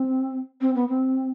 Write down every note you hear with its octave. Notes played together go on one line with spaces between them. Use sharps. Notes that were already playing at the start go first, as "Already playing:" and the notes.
Already playing: C4
C4
B3
C4